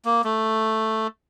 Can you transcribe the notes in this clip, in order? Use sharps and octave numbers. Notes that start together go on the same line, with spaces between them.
A#3
A3